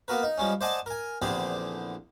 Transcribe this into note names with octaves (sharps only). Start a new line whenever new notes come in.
A#3 B3 F#4 A#4 B4
D#4
F3 G3 G#3 C#4
C5 D5 D#5 F#5 G#5 A5
A#4 G#5
A#1 E2 D3 C4 G4 G#4